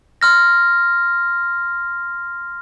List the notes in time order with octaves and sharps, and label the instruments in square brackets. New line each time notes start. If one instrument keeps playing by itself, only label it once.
[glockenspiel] C6 F6 A#6